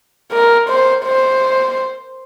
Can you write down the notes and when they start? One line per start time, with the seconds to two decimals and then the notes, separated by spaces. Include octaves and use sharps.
0.32 A#4
0.69 C5
1.05 C5